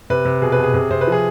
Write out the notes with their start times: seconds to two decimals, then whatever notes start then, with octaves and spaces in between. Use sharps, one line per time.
0.10 C3 B4
0.25 C3
0.42 B2 G#4
0.52 B4
0.58 B2 G#4
0.74 C3 G#4
0.91 C3 C5
1.01 B4
1.07 F3 G#4